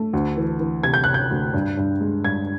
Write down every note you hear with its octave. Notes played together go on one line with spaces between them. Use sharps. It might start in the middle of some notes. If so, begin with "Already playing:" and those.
Already playing: A3
D2
E3
E3
C3 G#6
G6
C3 F#6
G6
D2
G2
G2
G#3
G2 G#6